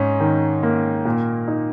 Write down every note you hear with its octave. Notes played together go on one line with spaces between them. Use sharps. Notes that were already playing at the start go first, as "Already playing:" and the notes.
Already playing: G#2 C#4
D#3
A#3
A#2
D#4